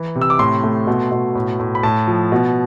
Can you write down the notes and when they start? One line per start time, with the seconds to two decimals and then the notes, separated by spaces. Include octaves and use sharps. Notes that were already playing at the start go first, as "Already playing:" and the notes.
Already playing: E3
0.15 C3
0.21 E6
0.30 D6
0.39 A2 C6
0.64 A3
0.87 B2
1.12 B2
1.35 A2
1.60 A2
1.75 B5
1.83 A2 A5
2.07 F3
2.32 B2